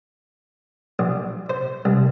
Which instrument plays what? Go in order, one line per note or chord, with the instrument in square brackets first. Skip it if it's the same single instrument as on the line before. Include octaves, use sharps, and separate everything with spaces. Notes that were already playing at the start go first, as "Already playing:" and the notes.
[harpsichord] A#1
C5
C2